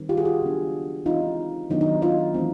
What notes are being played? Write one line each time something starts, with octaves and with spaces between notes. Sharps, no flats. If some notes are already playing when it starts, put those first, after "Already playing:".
Already playing: D#3 G3 C4
F4 G4
F#4 G#4
F4 G4
C#3 F#3 B3 D4
E3 G#3 C4 D#4 F4
D#3 F#3 B3 D4 D#4
D#4
D#4 F4
E3 A3 C4